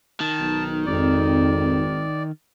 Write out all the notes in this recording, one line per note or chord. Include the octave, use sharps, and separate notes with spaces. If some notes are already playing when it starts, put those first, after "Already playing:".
D#3 A5
B1
G#1 F2 D5